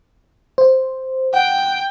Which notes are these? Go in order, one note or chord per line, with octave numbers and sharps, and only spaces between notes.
C5
F#5 G5